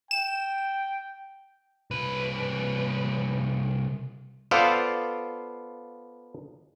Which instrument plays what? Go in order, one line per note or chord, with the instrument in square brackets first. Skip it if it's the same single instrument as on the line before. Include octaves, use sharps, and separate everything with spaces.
[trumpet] G5 [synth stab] E7
[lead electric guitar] C2 B4
[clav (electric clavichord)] B3 F4 A4 C5 D5 F5